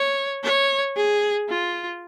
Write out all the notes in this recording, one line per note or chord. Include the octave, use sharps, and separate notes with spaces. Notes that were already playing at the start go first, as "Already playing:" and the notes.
Already playing: C#5
C#5
G#4
F4